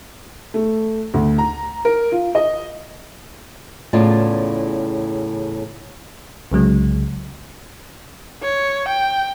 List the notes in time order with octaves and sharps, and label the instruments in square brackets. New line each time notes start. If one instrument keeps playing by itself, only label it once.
[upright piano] A3
D2
A#5
A#4
F4
D#5
[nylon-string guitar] E2 A2 C#3 F4 D5 A5
[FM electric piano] C2 C#3 F#3 G#3
[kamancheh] C#5
G5